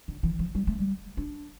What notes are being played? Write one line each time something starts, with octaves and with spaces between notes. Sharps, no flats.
D3
E3
F3
G3
A3
G3
D4